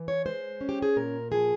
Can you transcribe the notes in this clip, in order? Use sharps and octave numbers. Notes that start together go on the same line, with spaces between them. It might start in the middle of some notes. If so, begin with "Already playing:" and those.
Already playing: E3
C#5
G#3 C5
C#4
G4
G#4
A#2 A#4
F3 G#4